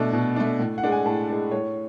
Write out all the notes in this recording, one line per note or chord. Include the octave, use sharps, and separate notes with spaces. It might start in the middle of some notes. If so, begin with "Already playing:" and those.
Already playing: B2 A3 D4
B2
A3 D4
A2
F#5
G#3 D4
G#5
A2 A5
G#3 D4
A2 C#5